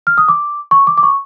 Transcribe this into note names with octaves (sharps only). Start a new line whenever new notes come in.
F6
D#6
D6
C#6
D6
D6
C#6